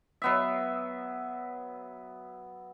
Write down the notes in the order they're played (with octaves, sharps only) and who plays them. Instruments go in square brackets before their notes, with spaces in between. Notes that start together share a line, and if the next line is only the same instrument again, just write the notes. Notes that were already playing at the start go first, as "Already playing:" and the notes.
[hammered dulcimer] F#3 B3 E5